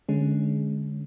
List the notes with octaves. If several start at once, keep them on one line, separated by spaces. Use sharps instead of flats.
D3 G#3 C#4